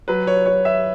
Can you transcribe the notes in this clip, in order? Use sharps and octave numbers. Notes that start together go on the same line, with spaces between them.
F#3 B4
C#5
F#3 C#5
E5